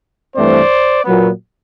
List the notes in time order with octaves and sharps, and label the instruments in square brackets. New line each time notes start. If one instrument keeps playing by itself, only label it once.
[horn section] G2 E3 A3 C4 C5 D5
A#2 F#3 B3